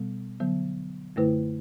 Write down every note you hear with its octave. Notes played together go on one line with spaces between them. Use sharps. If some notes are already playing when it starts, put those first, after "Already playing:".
Already playing: B2 G3 B3
D3 F#3 B3
F#2 D3 A3 E4 B4